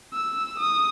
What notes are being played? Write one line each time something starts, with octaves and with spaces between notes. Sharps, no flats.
E6
D#6